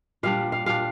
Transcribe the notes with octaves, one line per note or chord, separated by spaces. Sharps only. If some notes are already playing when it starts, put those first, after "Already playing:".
A#2 G3 D4 F5
F5
A#2 G3 D4 F5